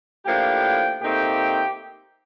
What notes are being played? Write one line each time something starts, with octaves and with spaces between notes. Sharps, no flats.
A2 F3 A#3 D4 G4 G5
A#2 A3 C4 D#4 G4 G5